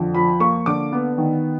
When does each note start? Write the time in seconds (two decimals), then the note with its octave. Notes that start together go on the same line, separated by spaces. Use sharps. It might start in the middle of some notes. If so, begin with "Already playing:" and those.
Already playing: F2 D3
0.14 F3 B5
0.40 A#3 C#6
0.66 D3 D6
0.93 B3
1.18 D#3